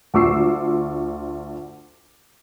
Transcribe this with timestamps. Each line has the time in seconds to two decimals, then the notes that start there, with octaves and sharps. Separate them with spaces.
0.14 D2 F4 C#6 D6 E6 C7